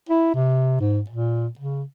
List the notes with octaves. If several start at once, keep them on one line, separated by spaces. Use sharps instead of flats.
E4
C3
G#2
A#2
C#3